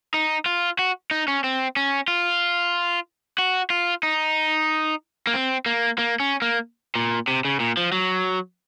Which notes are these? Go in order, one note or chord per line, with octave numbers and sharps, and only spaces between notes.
D#4
F4
F#4
D#4
C#4
C4
C#4
F4
F#4
F4
D#4
A#3
C4
A#3
A#3
C#4
A#3
A#2
C3
C#3
A#2
F3
F#3